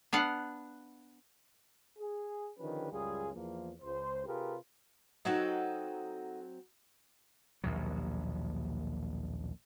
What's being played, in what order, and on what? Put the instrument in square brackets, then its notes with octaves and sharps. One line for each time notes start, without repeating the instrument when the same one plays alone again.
[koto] B3 D4 F5 F#5
[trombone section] G#4
D3 D#3 F3 C#4 G4 B4
C#2 F#2 G3 F4 G#4
E2 F3 A#3
C#2 C5
C3 F4 G4 G#4 A#4 B4
[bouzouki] F#3 C4 D#5 [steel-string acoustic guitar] D#4 A4 F#5
[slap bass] A#1 D#2 B2 F#3